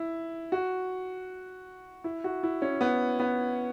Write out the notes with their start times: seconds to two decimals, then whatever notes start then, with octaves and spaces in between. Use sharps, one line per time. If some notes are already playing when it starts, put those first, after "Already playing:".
Already playing: E4
0.52 F#4
2.04 E4
2.24 F#4
2.43 E4
2.62 C#4
2.81 B3
3.20 B3